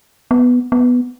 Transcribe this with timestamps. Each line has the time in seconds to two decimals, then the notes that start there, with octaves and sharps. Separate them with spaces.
0.31 B3
0.72 B3